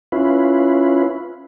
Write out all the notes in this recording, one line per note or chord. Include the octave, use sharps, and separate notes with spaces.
C#4 E4 F4 B4